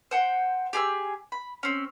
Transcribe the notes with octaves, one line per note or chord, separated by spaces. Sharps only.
C5 F#5 G5
G4 G#4 A#5 E6
B5
C4 C#4